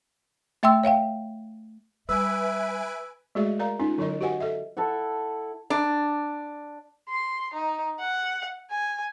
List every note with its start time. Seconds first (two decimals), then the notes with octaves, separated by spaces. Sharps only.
0.63 A3 E5 G5 C6 E6
0.84 C#5 E5 F5 G5
2.09 G3 B4 E5 G#5 E6 D7
3.35 G#3 A3 F#4 G#4 D5 E5
3.59 A#4 D5 F5 A#5
3.80 C#4 D#4 F4
3.98 D3 F#3 E4 A#4 D#5
4.21 F#4 G4 C5 D#5 F#5 G#5
4.40 A4 D#5 E5
4.77 E4 A4 E5 F#5
5.70 D4
7.09 C6
7.54 D#4
7.99 F#5
8.70 G#5